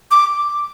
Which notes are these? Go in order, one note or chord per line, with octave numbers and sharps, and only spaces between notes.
D6